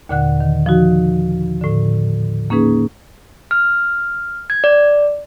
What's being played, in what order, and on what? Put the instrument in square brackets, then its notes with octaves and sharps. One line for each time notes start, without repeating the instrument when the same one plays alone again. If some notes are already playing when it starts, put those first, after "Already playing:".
[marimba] D#2 A#2 D3 F#5 F#6
D#3
F3 D#4 F#4
A2 D3
A#3 C#4 D#4 G#4 B4
[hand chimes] F6
G#6
D5